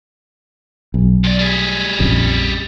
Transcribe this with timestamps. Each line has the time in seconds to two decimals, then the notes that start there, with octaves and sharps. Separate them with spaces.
0.94 B1
1.24 F2 D5
1.39 G3 G#4
1.99 A#1 F2 C#3